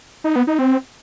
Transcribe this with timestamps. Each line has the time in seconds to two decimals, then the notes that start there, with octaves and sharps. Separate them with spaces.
0.24 D#4
0.36 B3
0.47 D#4
0.59 C4